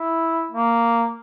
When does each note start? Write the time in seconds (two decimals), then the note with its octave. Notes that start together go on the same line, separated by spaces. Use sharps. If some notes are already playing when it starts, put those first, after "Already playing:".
Already playing: E4
0.51 A#3